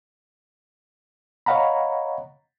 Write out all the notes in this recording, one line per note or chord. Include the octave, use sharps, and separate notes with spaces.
C#5 D#5 F5 F#5 A#5 B5